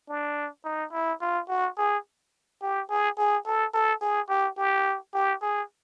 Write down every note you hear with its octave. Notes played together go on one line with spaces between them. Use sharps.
D4
D#4
E4
F4
F#4
G#4
G4
G#4
G#4
A4
A4
G#4
G4
G4
G4
G#4